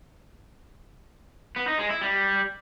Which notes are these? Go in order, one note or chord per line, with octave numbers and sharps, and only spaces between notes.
B3
D#4
G#3
E4
G3